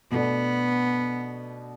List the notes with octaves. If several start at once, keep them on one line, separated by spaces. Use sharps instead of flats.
B2 A3 B3 D4